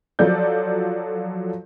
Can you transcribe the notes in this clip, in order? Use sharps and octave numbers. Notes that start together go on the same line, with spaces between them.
F3 F#3 A4 D5 G6